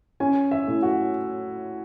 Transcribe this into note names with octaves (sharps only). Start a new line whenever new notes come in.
C#4 G#5
E5
A2
F#4